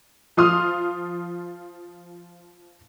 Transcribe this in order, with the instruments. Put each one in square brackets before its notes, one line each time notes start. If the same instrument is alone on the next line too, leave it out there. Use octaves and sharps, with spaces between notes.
[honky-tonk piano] F3 F4 C6 D#6 F6